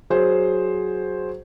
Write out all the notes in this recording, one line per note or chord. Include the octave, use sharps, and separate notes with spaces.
F#3 G#4 C5